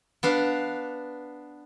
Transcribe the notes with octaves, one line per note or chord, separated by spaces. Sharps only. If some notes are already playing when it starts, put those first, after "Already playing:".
B3 D4 F5